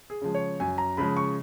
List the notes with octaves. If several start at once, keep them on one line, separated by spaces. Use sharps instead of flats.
G#4
C#3 F3 G#3
C#5
F#2 G#5
A#5
C#3 F3 G#3 B5
C#6